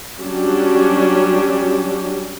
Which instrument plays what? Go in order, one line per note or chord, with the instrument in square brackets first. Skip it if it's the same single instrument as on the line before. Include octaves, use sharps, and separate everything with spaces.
[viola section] F#3 G3 C#4 D4 G4